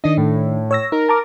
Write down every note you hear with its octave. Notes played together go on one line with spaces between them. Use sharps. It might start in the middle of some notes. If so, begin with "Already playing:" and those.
D#3 D4 D#5
A2
C#5 E6 A#6
D#4 A#4
A5 A#5 D6